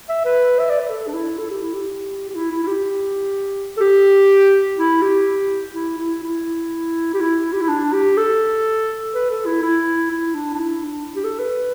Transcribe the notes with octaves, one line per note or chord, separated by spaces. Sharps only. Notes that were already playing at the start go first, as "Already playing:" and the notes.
E5
B4
E5
D5
B4
A4
D4
E4
A4
G4
E4
G4
G4
E4
E4
E4
G4
A4
G4
E4
G4
E4
E4
E4
G4
E4
G4
E4
D4
G4
A4
B4
A4
E4
E4
E4
D4
D4
E4
D4
G4
A4
B4